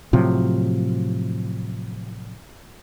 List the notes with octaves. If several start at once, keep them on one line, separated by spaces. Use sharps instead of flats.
A2 C3 F3 F#3